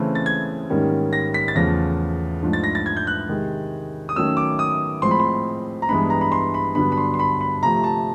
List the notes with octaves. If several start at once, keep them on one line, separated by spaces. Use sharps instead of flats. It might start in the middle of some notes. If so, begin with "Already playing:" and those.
Already playing: C#3 E3 A3 C4
A6
G#6
G#2 D#3 G3 A#3 C#4
A#6
B6
A6
E2 C#3 F3 A3 A#6
G#2 F3 A3 D4
A6
A#6
A6
G#6
G6
F#6
C3 D#3 G#3
D#6
D#3 F#3 A3 C#4 E6
D6
D#6
A2 F3 G#3 C4 C6
B5
C6
A#5
G2 E3 G#3 B3 D4 B5
A#5
B5
C6
B5
G2 D3 F#3 B3 D4 B5
B5
C6
C6
B5
B5
C3 F3 A3 A#5
A5